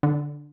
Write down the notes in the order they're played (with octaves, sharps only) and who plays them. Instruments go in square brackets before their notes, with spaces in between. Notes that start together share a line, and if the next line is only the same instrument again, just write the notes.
[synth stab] D3